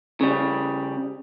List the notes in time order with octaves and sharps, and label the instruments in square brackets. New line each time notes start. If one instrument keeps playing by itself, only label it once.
[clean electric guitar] C#3 G3